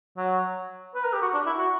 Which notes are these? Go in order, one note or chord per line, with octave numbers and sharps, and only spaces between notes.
F#3
B4
A#4
G4
F#4
D4
E4
F#4